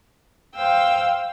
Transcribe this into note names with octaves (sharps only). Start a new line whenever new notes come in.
C5 F5 G5 E6